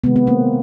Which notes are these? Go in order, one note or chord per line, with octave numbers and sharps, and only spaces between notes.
C3 D#3 G#3 B3
B3
A#3 C4